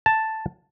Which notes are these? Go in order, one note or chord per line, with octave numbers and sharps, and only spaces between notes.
A5